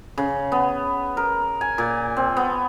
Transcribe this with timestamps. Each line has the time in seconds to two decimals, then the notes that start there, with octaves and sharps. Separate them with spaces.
0.18 C#3
0.52 B3
1.17 A#4
1.61 G#5
1.78 A#2
2.17 C4
2.37 B3